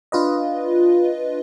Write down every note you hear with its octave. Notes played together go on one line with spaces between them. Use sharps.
D4 F4 B4 D#5